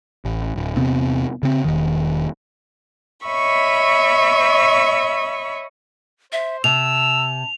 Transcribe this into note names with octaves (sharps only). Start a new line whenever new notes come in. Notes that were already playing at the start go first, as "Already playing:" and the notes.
A1
D1
E2 C3 B3 C4
C#3 C4
E1 D#3
C#5 D#5 E5 B5 C#6
C5 E5
C3 A5 E6 F7